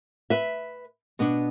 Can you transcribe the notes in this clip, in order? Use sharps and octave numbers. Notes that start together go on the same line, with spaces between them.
B4 E5
B2 B3 D4